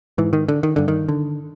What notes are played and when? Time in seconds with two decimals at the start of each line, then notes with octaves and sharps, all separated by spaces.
0.18 G#2 E3
0.33 D#3
0.48 D3
0.63 D#3
0.76 G2 D3
0.88 D#3
1.09 D3